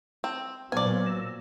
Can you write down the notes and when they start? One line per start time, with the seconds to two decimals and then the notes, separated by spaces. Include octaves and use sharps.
0.24 C4
0.72 A#2 F#3 B3 C5 D5 F5 G#5
1.06 A#5 E6